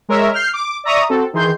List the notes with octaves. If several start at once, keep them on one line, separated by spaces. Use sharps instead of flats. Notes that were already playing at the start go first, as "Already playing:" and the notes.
G#3 A#4 C#5 E5
F6 G6 C7
D6
D5 E5 A#5 C#6 D#6
C4 F#4 A4
D#3 E3 G#4 C6 G6